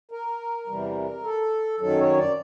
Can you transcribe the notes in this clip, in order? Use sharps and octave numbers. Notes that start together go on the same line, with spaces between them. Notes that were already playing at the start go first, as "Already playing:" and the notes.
A#4
E2 C3 E3 G3
A4
F#2 D#3 F#3 A4
C#5
D5